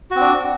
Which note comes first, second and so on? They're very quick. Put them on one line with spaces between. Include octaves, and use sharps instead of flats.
F#4 C4 D4